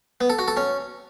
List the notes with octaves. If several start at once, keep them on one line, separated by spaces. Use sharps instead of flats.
B3
A4
F#4
A4
C#4